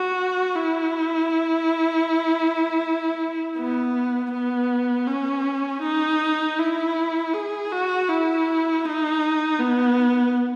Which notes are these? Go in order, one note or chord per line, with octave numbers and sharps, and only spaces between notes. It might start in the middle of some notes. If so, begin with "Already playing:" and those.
Already playing: F#4
E4
B3
B3
C#4
D#4
E4
G#4
F#4
E4
D#4
B3